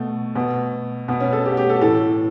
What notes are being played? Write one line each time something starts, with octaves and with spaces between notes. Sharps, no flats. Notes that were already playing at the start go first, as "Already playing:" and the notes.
Already playing: B2 A3
B2
B2 B3
C#4
A4
G4
F#4
G4
A4
A2 E3 A4